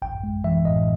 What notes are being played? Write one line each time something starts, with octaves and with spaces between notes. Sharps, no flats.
A1 G5
G#3
E3 E5
A2 D#5